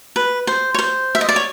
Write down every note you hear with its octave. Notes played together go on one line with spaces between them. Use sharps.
B4
C5
C#5
C5
E5
D#5
D5
C#5